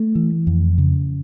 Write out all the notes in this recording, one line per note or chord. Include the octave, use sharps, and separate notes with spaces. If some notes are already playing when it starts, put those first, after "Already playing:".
Already playing: A3
E3
F2
C#3